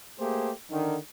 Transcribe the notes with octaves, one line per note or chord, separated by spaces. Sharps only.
A3 A#3 G4 G#4 C5
D3 D#3